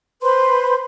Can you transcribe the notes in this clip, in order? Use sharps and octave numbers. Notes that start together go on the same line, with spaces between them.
B4 C5 B5 C6